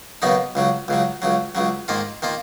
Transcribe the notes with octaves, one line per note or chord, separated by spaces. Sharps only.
D#2 C#3 F#3 B3 D#4
C#2 C#3 F#3
C#2 C#3 F#3
C#2 C#3 F#3
C#2 C#3 F#3
G#2 D#3 A#3 F4
D#3 A#3 F4